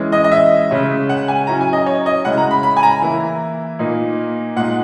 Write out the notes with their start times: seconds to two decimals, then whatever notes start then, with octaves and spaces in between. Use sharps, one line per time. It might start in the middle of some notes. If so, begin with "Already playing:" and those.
Already playing: E3 G#3 C#4
0.12 D#5
0.24 D#5
0.32 E5
0.71 C#3 G#3 C#4
1.09 F#5
1.28 G#5
1.47 F#3 C#4 E4 A#5
1.61 G#5
1.73 D#5
1.86 C#5
2.06 D#5
2.25 C#3 G#3 C#4 E4 F#5
2.37 A#5
2.51 B5
2.63 B5
2.77 G#5
2.83 A#5
3.02 E3 A#3 E4
3.79 A#2 A#3 D#4
4.56 A#2 G#3 D#4 F#5